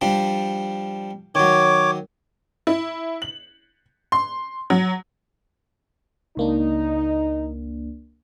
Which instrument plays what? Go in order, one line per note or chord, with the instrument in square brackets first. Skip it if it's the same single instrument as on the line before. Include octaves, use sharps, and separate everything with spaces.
[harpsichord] F3 G3 D4
[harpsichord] D#3 F#3 [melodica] C#5 D6
[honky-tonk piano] E4
F#7
C6
F#3
[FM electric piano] C#2 A#3 D4 [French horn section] D#4